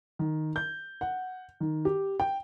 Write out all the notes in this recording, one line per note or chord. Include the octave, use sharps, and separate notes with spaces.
D#3
G6
F#5
D#3
G4
G5